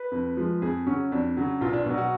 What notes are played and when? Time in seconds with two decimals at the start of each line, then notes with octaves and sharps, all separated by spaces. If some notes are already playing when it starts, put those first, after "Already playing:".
Already playing: B4
0.12 F2
0.37 F3 G#3
0.62 F2 G#4
0.86 C#3 F#3 C#4
1.12 F2 D4
1.37 C#3 F#3
1.61 B1 F4
1.73 D4
1.86 B2 F#3
1.98 F#4